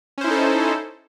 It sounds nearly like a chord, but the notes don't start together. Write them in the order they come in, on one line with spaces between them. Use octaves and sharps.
C#4 C5 E4 D#4 A4